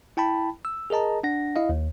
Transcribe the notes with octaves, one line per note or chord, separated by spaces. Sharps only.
E4 G5 A5 B5
E6
G#4 A#4 D#5 A5 A#5
D4 F#5 A#6
E4 D#5 F5
D#2